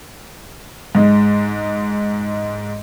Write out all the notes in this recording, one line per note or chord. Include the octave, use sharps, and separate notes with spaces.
G#2 G#3